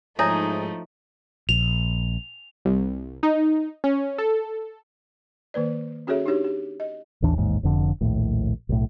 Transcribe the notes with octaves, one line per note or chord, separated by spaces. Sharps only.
G#2 F3 A3 D#4 E4 G#4 C#5 E5
A#1 F7
C2
D#4
C#4
A4
D#3 A#3 B4 D5
C#4 F#4 G#4 A4 C#5 E5
D4 D#4 F#4 G4 C#5
G4
D#5
A1 D#2 E3 D4
A1 D#2 G#2
F1 F2 D3
A#1 D#2 A2
B1 A2